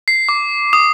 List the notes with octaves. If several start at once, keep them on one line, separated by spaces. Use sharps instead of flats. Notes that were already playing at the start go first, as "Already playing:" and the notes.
C7
D6
D#6